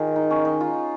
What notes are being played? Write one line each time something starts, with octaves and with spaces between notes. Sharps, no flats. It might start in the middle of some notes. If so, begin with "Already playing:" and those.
Already playing: D#3 F4 G#4 A#4
D#4
C#4
D#4
F4